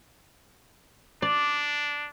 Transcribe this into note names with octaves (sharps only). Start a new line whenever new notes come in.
D4 D5